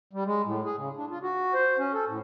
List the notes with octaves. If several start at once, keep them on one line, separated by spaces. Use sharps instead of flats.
G3
G#3
A2
G#4
C#3
D4
F4
F#4
C5
C#4
A4
A2